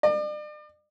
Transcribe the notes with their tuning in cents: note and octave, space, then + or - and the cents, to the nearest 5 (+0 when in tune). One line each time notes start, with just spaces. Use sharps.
D5 +40